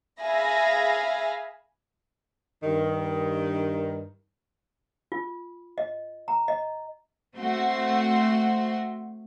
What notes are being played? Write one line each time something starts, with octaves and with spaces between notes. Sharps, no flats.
G#4 E5 F5 G#5 B5 A#6
G2 D#3
F4
D#5
A#5
D#5
A3 C4 F#4 C6